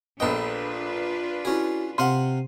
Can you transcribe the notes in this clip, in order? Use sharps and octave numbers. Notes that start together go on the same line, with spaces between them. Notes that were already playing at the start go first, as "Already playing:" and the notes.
A#1 B3 D4 F4 A4 B4 D#5 G5
C#4 E4 F#4 G#4
C3 F5 F#5 C6 D#7